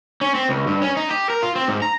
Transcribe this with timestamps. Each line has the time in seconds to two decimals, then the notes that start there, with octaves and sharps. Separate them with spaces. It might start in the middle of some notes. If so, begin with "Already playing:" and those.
0.21 C#4
0.35 C4
0.49 C#2
0.67 G2
0.82 C#4
0.97 D#4
1.10 G4
1.30 A#4
1.43 F4
1.55 C4
1.68 G#2
1.82 A#5